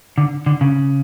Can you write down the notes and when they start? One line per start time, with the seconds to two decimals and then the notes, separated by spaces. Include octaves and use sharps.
0.18 D3
0.46 D3
0.61 C#3